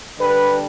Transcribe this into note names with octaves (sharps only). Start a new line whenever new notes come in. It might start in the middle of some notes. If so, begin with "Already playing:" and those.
D3 G3 B4